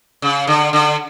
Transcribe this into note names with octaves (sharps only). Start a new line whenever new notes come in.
C#3
D3
D3